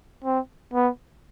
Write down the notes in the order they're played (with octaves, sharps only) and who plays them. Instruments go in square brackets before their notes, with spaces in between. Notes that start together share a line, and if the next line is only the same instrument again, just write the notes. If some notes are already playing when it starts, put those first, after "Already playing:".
[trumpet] C4
B3